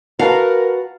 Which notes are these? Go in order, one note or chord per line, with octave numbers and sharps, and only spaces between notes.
F#4 A#4 B4 F5 F#5 A5 A#5